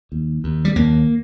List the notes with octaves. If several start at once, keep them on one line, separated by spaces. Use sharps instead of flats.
D#2
D#2
G3
D#2 A#3